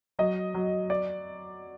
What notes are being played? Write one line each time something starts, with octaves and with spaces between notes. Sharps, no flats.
F#3 D#5
F#3
D5